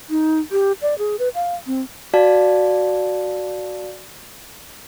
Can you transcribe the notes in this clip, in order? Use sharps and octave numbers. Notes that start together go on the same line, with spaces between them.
D#4
G4
D5
G#4
B4
F5
C4
F#4 D5 F5 A5